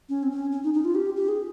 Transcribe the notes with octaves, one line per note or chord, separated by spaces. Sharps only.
C#4
C4
C#4
C#4
D#4
D#4
F4
G4
G4
G#4